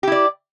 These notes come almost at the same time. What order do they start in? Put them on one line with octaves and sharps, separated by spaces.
G4 E4 D5